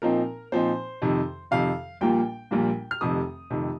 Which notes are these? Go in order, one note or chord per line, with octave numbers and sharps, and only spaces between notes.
A#2 F3 C4 D#4 A#4
A#2 F3 C4 D#4 C5
F2 C3 D#3
F2 C3 D#3 F5
A#1 A#2 G3 A#3 F4 G5
A#1 A#2 G3 A#3 F4
F6
F1 F2 C3 D#3 D#6
F1 F2 C3 D#3